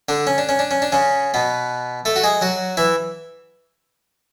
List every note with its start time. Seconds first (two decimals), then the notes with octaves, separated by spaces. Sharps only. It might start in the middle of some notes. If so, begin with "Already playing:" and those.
0.09 D3 D4
0.27 C#4
0.38 D4
0.49 C#4
0.59 D4
0.71 C#4
0.82 D4
0.92 C#3 C#4
1.34 B2 B3
2.05 A3 A4
2.16 F#4
2.24 G#3 G#4
2.41 F#3 F#4
2.77 E3 E4